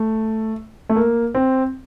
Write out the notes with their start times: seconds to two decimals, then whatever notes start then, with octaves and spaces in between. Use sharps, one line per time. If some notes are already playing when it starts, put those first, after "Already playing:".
Already playing: A3
0.89 A3
0.96 A#3
1.35 C4